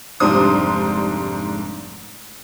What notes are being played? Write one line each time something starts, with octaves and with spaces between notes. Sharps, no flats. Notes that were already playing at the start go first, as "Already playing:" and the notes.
F1 G#2 G3 D4 C5 D#6